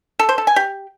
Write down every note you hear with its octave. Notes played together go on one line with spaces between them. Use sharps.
A4
C5
A4
G#5
G4